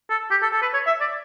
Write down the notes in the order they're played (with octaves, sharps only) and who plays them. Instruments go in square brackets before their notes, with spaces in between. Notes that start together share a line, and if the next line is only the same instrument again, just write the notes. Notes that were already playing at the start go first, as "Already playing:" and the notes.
[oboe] A4
G4
A4
A4
B4
C#5
E5
D5